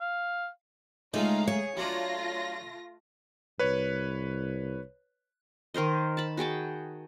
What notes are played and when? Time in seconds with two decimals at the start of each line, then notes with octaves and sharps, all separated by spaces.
0.01 F5
1.14 C#3 G#3 A3 D#4 F4 F5 A#5
1.48 G#4 C#5
1.77 F#3 A3 D4 F4 A#6
3.59 C2 B4 C#5
5.74 D#3 A#4 C5 D#5
6.17 A5 B5
6.37 F#4 G#4 G5 A5